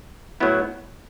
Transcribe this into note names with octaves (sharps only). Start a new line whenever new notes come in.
A2 F#3 B3 E4